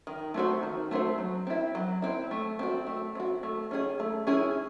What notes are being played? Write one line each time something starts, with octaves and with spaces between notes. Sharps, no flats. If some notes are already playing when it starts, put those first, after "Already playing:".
D#3
A3 C4 F#4 C5
D#3
A3 C4 F#4 C5
F#3
C4 E4
F#3
C4 E4
A3
C4 F#4
A3
C4 F#4
A3
C#4 E4 G#4
A3
C#4 E4 G#4